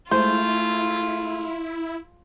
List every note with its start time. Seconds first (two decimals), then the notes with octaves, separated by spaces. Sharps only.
0.11 G#3 A3 E4 F4 C5